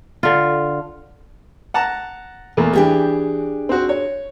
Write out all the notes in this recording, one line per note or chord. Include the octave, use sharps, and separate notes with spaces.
D3 F4
F#5 A5 A#5
E2 A3 A#3
E3 D4 G4 G#4
C4 F#4
C#5